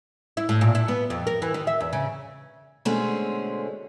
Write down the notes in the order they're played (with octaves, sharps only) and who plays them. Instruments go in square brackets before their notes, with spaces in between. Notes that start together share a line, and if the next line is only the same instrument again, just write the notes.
[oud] E4
A2
A#2
E4
B3
F2
A#4
E3
D#3
E5
E2
C#3
[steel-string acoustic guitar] B2 D3 G#3 A3 C4 C#4